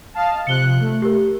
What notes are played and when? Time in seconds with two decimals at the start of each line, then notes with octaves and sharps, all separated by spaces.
0.14 D#5 F5 A5
0.47 C3 F3 F#6 C#7 G7
0.80 A3
1.02 G4 A#4